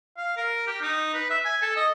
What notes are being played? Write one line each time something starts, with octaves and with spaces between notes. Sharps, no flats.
F5
A#4
G4
D#4
B4
E5
G#5
A4
D#5